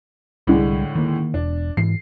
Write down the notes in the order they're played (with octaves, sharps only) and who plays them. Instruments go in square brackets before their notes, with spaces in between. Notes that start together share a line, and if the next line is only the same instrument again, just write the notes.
[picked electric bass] C2 G3 [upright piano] A2 D3 G#3
[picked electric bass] D#3 A#3
[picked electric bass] E1 [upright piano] D4
[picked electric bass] G#2 E3 [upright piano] C7